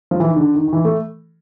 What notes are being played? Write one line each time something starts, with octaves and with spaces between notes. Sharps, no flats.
F3
E3
D#3
D3
D#3
D#3
E3
A3